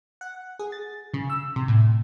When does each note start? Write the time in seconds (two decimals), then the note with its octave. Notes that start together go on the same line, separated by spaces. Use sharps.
0.21 F#5
0.59 G#4
0.72 A6
1.14 C#3
1.30 E6
1.56 C3
1.68 A2